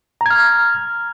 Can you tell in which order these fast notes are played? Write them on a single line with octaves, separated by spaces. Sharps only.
A#5 G#6 F6